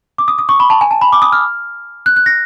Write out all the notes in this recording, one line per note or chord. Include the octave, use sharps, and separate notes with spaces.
D6
D#6
D#6
C#6
B5
A5
G#5
A5
B5
D6
D#6
F6
F#6
F#6
A#6